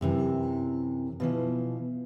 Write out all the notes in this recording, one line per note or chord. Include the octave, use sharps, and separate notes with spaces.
F#2 C3 E3
B2 E3 F3